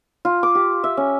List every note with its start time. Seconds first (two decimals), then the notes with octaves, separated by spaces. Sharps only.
0.25 F4
0.43 D6
0.55 G4
0.84 E5
0.97 C#4